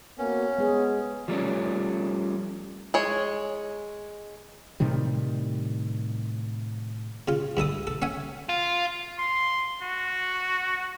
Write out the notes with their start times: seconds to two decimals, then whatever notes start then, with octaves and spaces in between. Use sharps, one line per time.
0.18 A#3 B3 C#4 F#4
0.58 G#3 B3 G#4
1.28 F3 G3 A3 C#4
2.94 G#3 C#5
4.80 A2 C3 D#3 G3
7.28 C#3 F4
7.57 G2 E4 A4 D#6
7.87 A4
8.02 C#4 E5 F#5 G#5
8.49 F4
9.19 C6
9.83 F#4